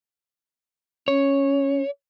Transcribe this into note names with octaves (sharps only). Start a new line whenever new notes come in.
C#4 C#5